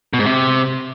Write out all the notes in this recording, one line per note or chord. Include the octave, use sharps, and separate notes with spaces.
B2
G#2
C3